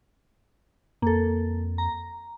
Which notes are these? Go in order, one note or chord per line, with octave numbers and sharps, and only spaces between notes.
F2 A#3 A4
A#5